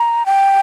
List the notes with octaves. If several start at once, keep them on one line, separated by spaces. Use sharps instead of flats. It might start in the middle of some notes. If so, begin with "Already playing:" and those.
Already playing: A#5
G5